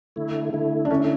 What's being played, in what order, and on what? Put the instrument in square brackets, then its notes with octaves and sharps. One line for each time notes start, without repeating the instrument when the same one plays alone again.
[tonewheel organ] D3 A3 E4
D3 A3 E4
[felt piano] D4
[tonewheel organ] D3 A3 E4 [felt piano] C#4